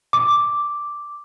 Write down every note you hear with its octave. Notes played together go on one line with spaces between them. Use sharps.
D6